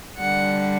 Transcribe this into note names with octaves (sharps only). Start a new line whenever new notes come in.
D3 G3 D4 F#5